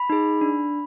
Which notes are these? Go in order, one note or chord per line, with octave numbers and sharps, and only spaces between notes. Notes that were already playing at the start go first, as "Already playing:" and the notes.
Already playing: B5
D#4 G#4
D4